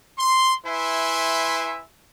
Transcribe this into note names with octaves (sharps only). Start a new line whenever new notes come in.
C6
E4 B4 E5 G#5 C6